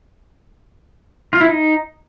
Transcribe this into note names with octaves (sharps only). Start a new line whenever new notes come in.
F4
E4
D#4